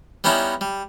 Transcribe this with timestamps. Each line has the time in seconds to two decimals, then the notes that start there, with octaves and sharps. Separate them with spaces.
0.24 G3 B3 C#4 D#4 E4
0.61 G3